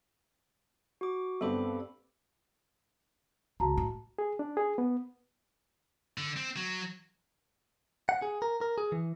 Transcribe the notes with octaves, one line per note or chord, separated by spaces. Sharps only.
F#4 D6
G2 B3 C4 A4 B5 D6
C#2 F#4 A5 A#5
A2
G#4
D4
G#4
B3
D3
C4
F#3
F#5
G#4
A#4
A#4
G#4
E3